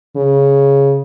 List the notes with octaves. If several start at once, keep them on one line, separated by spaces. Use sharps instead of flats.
C#3